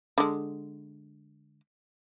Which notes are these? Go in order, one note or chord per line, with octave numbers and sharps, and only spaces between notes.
D3 G#3